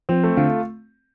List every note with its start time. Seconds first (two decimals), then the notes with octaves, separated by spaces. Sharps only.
0.09 F3 C4
0.24 A3
0.37 D3 F4